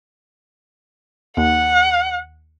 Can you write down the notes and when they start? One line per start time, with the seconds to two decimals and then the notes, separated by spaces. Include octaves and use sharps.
1.37 D#2 F#5